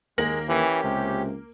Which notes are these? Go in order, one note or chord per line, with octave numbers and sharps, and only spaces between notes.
D#2 G#3 A#3 A#6 F#7
E3 C#4 G4
C#2 C3